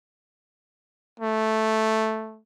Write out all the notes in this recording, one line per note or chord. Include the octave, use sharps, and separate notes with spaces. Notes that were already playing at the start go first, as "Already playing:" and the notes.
A3